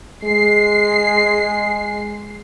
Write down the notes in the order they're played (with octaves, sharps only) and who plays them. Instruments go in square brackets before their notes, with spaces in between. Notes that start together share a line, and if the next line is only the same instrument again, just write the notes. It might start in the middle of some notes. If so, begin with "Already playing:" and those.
[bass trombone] G#3 [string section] C7